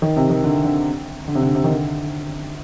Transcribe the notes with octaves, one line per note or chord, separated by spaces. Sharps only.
D#3
C3
D#3
D3
D3
D3
C3
D3
C3
D#3
D3